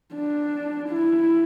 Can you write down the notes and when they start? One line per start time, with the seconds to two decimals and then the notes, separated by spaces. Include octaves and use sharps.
0.15 D4
0.89 E4